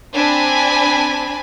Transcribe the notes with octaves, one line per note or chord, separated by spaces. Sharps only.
C4 D4 G#5 A5 B5